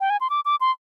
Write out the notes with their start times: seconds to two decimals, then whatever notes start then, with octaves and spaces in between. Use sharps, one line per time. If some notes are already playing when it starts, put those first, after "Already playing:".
0.01 G5
0.10 G#5
0.21 C6
0.30 D6
0.45 D6
0.61 C6